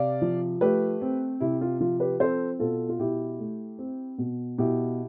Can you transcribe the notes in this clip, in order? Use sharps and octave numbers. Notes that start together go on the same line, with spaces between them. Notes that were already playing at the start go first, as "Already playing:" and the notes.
Already playing: C3 D5 F5
F3
A3 G4 B4
C4
C3 E4
F4
F3 F4
G4 B4
C4 A4 C5
B2 F4 A4
F4
B2 E4 G4
A3
C4
B2
B2 E4 G4